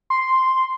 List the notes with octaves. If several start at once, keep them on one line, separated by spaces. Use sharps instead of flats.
C6